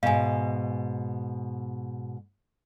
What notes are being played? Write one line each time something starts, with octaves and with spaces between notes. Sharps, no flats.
G#2 B2 F5 G#5